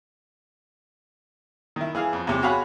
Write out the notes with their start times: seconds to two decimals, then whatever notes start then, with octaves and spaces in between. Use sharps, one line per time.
1.76 D#3 E4
1.95 E3 G#4 F5
2.13 F2
2.27 E2 C3
2.43 F#4 G#4 C#5 F5 F#5 B5